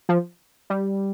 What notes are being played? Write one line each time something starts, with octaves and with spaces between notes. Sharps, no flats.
F3
G3